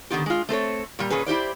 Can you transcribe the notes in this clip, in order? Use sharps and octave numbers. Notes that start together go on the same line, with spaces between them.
D3 D#3 B3 F4 G4
G#3 F4
A3 C4 A4 C#5
A#2 G3
A#2 C#4 G#4 B4
E4 G4 C5 D5